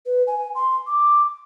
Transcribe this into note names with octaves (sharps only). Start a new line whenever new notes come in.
B4
G#5
C6
D6